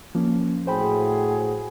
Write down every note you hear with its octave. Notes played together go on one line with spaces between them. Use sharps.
F3 A#3 C#4
A2 F#4 G#4 C5 G5 B5